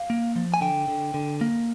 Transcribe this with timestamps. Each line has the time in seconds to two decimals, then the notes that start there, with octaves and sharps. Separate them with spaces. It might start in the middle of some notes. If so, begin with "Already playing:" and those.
Already playing: F5
0.10 A#3
0.36 F3
0.54 G#5
0.61 D3 G5
0.88 D3
1.14 D3
1.41 A#3